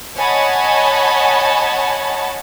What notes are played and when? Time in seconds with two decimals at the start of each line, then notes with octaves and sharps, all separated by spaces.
0.17 C#5 D#5 F#5 G#5 A5 B5